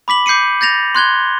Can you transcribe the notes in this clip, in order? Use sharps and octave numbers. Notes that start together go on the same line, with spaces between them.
B5 D6 B6 F#7
D6 G6 C7 C#7 D#7
G6 A6 A#6 F7
C6 F#6 G#6 G7